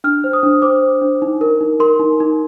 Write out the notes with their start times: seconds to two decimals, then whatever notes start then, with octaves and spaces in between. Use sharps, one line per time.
0.04 D4 F6
0.24 C5
0.33 D#6
0.43 D4
0.62 C5 D6
0.82 C5
1.01 D4
1.22 D#4
1.41 A#4
1.61 D#4
1.80 A#4 C6
2.00 D#4
2.20 D#4